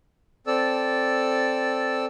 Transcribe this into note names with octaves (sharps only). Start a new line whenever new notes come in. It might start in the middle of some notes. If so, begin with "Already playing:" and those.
C4 A4 D5 E6